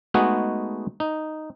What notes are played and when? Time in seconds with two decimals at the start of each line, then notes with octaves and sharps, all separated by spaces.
0.14 G#3 A3 B3 D#4 F#4 G#4
1.00 D#4